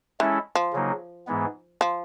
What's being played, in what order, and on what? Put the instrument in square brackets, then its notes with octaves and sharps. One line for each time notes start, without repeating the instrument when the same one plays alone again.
[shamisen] E3 [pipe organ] G#3 C#4 E4 A4
[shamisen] F3
[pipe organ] C#3 F#3 A#3 D#4
G#2 E3 G#3 B3
[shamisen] F3